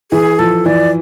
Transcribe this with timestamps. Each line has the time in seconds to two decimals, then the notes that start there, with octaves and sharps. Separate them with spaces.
0.11 E3 G#4
0.39 F3 A4
0.66 E3 D5